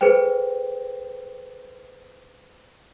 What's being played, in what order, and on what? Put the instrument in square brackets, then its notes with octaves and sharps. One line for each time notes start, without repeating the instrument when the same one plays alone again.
[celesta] G#4 A4 B4 C5 G5